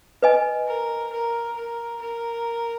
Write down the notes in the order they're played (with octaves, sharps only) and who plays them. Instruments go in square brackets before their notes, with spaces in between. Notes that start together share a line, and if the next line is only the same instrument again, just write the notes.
[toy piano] B4 D#5 G#5
[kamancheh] A#4
A#4
A#4
A#4